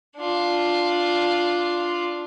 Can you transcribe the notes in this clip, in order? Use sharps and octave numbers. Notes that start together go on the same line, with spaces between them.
D4 F4